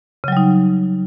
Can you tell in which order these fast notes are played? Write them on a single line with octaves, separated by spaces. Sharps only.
C#3 F#3 G3 D#4